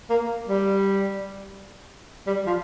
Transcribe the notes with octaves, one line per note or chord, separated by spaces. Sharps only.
A#3
G3
G3
F3